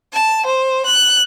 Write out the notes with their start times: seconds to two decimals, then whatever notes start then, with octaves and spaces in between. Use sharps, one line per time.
0.13 A5
0.45 C5
0.85 F#6